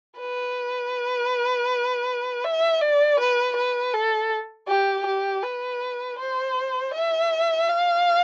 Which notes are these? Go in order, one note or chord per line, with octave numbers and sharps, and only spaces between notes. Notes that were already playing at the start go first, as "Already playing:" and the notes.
B4
E5
D5
B4
B4
A4
G4
G4
B4
C5
E5
F5